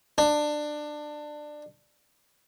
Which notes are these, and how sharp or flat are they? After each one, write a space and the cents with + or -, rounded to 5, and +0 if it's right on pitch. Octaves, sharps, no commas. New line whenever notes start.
D4 +20